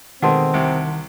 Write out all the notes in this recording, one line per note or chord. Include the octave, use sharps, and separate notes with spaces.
B2 D#3 G#3 A3 C4 F#5 A5 C6
C2 C3